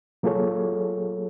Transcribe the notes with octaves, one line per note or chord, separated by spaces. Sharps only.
F#3 A#3 F4 G#4 A4 C#5